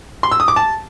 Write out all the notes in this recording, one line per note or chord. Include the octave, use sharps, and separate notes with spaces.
C6
E6
D#6
D6
A5